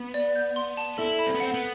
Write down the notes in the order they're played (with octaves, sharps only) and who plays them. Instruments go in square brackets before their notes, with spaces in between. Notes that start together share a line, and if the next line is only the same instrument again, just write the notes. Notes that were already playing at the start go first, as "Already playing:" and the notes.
Already playing: [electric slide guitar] B3
[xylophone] D5
G6
C6
A5
[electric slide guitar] E4 [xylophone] A4
[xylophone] B5
[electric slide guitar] C4
B3
[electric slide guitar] C4 [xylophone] F#5
[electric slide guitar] B3